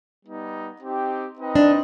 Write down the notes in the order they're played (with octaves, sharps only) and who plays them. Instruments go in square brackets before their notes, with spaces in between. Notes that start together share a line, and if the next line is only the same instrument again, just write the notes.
[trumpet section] G3 B3 D#4
C4 D#4 G4
C4 D#4 B4 D#5 G5
[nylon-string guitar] D4